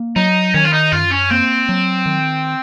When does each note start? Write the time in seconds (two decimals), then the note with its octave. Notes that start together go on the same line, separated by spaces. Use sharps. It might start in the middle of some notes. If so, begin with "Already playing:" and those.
Already playing: A#3
0.16 F#3 D#4
0.54 D#3 C#4
0.65 F4
0.73 D#4
0.92 F#2 F4
1.11 C#4
1.30 A#3 C4
1.69 F#3
2.06 D#3